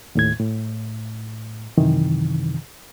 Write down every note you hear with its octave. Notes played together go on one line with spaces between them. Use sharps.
D#2 A2 G#6
A2
F#2 C3 D#3 E3